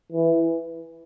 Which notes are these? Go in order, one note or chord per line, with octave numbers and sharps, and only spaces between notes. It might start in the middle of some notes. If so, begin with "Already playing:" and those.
E3